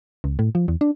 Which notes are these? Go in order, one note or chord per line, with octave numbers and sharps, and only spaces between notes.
C#2
A2
F3
E2
D4